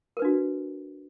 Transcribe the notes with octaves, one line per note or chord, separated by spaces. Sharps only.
D4 F#4 A#4 B4